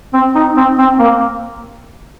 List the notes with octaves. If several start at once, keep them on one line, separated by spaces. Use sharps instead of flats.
C4
D#4
C4
C4
A#3